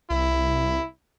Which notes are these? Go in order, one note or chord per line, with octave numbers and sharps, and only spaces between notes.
C2 E4